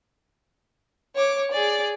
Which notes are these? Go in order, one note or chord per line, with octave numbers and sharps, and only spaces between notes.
C#5 D6
G#4 D5